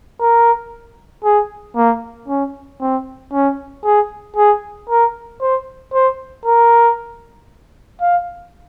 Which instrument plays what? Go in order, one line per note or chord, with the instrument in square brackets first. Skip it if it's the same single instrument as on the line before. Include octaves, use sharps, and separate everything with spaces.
[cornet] A#4
G#4
A#3
C#4
C4
C#4
G#4
G#4
A#4
C5
C5
A#4
F5